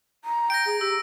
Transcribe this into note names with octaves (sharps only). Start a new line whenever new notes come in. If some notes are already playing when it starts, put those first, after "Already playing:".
A#5
G5 A#6 D7
G#4
G4 E6